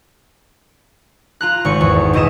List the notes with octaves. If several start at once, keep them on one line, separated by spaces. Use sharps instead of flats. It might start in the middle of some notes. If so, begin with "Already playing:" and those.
F4 A#5 F#6
G#1 C#6
E2
G#2 B2 E4 D#5 A#6 E7